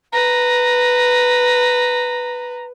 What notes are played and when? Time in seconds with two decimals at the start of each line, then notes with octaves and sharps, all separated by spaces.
0.13 B4 A#5